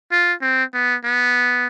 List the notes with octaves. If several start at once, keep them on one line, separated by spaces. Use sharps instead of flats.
F4
C4
B3
B3